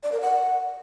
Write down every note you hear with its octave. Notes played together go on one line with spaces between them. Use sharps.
D5
A#4
F#5